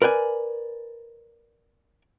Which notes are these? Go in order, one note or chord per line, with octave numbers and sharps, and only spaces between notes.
A#4 B4 D5 G5 G#5